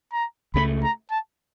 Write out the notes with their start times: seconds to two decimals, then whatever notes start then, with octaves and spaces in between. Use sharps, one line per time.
0.12 A#5
0.54 C#2 C#3 F#3 A3 B5
0.83 A#5
1.10 A5